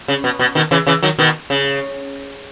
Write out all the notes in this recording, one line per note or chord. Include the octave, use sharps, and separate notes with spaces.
C#3
B2
B2
B2 D#3
C#3 E3
C#3 E3
D#3 F#3
B2 D#3
C#3